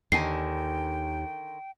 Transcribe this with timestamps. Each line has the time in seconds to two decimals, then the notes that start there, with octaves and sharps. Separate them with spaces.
0.12 D#2 D3 D#3 G5 G#5 C7